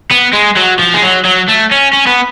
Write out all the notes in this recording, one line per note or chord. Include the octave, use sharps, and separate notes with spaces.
B3
G#3
F#3
F3
G#3
F#3
F#3
A3
C#4
C#4
B3